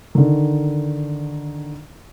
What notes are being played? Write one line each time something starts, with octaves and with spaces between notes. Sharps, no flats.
D3 D#3